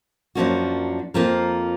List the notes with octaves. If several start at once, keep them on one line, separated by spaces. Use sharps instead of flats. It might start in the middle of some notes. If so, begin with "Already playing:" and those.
F#2 F3 A#3 D4 F#4
F2 F3 A#3 F4 A#4